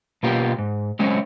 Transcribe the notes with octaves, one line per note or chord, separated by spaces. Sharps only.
B2 A#3 F4 G4
G#2
F#3 G#3 C4 C#4